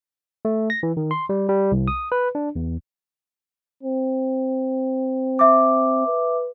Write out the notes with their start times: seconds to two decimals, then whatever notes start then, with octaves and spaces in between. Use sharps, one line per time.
0.45 A3
0.70 A#6
0.83 E3
0.97 D#3
1.11 C6
1.29 G3
1.49 G3
1.72 C2
1.88 D#6
2.12 B4
2.35 D4
2.56 E2
3.83 C4
5.39 E5 D6
6.07 B4